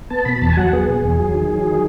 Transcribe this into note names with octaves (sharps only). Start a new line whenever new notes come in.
B3 A5
B2 B5
E2 A5
G#5
F#3 F#5
B3 G#4
B2
E2
F#3
D#3
F#3
D#3